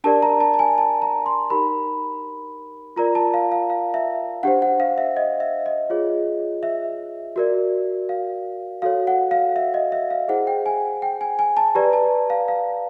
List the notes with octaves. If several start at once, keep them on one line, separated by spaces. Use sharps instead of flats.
D4 G4 A#4 D5 A5
A#5
A5
A5
G#5
A5
A#5
C6
D#4 G4 A#4 B5
F4 A#4 D5 A#5
A5
F5
F5
F5
E5
D4 G4 C5 F#5
F#5
F5
E5
D#5
E5
D#5
F4 G#4 C#5
E5
F#4 A#4 D5
F5
F#4 A4 C#5 F5
F#5
F5
E5
D#5
E5
F5
E4 G#4 C5 F#5
G5
G#5
G5
G#5
G#5
A5
G4 B4 D5 A#5
A5
F5
F5